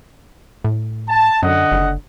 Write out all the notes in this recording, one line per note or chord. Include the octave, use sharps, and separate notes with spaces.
A2
A5
F#2 D3 D#5 F#5
F#1